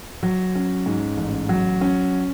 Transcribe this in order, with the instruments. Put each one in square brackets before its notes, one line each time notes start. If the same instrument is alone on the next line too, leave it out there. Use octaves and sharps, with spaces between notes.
[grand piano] F#3
C#4
G#2
A1
F#3
C#4